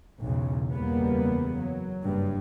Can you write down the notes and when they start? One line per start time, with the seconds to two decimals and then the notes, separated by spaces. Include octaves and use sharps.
0.22 B1 E2 G#2 C#3
0.72 F#1 E2 G3 A#3 B3
1.59 F#3
2.03 F#1 G2